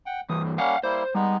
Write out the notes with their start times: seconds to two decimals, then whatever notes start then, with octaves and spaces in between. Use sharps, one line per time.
0.06 F#5 G5
0.29 G2 E3 D#6
0.44 F#3
0.58 G3 A#3 C#4 F5 F#5
0.83 G3 A#3 E4 C5
1.15 G3 G#3 B3 D#4